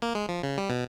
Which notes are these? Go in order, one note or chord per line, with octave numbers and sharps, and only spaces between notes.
A#3
G#3
F3
C#3
G3
B2